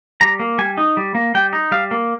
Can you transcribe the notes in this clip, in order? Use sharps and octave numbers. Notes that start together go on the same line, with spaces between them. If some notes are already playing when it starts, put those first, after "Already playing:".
G3 A#5
A#3
G3 G#5
D#4
G3
A#3
G3 G5
D#4
G3 F5
A#3